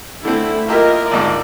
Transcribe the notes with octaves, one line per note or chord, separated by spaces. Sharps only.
D3 A3 C4 E4
A#3 F4 G4 A#4 D#5 E5
G#1 D2 G#2 D5